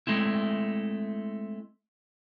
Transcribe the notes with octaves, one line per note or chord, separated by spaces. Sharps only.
G#3 A3 C4 E4